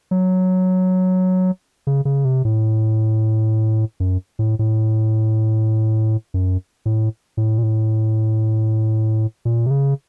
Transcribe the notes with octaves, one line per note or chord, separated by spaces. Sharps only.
F#3
C#3
C#3
C3
A2
F#2
A2
A2
F#2
A2
A2
A#2
A2
A#2
C3
C#3